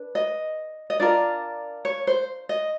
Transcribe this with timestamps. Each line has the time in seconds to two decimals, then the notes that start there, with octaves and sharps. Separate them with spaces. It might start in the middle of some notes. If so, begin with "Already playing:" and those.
Already playing: D4 B4
0.15 D#5
0.90 D#5
1.00 D4 F4 A#4 D5
1.85 C#5
2.07 C5
2.49 D#5